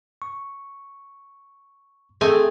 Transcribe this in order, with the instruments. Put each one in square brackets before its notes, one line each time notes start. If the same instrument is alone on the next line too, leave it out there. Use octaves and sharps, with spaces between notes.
[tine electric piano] C#6
[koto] A3 C4 G#5 [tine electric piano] G#4 E5 D#6